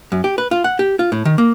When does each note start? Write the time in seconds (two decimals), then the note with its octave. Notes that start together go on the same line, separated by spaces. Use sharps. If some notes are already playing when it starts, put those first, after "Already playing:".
0.12 F#2
0.24 G4
0.38 B4
0.51 F4
0.64 F#5
0.79 G4
0.99 F4
1.12 A2
1.25 D#3
1.38 A#3